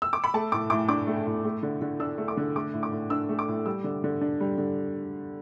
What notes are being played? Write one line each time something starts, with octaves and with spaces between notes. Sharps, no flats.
E6
D6
B5
A3 A5
A2 D6
A2 D6
D4 D6
A3
A2
A3
D3
D3
D4 E6
A3
D6
D3
A3 D6
A2
D6
A2
D4 E6
A3
D6
A2
G3 E6
D3
D3
D4
G3
D3